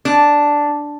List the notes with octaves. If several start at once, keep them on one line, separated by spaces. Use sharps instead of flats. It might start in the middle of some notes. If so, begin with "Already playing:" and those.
D4